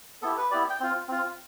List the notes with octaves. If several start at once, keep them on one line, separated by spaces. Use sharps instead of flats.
B3 E4 G4 A4
B4
B3 E4 G4 D5
G5
C4 F4
C4 F4